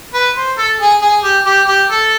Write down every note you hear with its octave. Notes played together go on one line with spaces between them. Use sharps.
B4
C5
A4
G#4
G#4
G4
G4
G4
A4